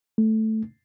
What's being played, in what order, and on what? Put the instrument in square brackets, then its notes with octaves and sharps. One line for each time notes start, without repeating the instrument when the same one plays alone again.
[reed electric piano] A3